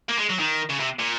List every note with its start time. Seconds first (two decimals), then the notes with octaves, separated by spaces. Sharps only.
0.09 A#3
0.19 G#3
0.29 F#3
0.39 D#3
0.69 C#3
0.79 C3
0.99 A#2